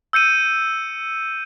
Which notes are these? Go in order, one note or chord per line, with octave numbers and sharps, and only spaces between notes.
E6 G6 C#7 D#7